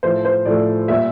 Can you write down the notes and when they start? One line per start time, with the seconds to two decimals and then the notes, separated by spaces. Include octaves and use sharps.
0.03 A2 F3 A3 C5
0.25 C5
0.46 A2 F3 A3 D5
0.88 A#2 G3 E5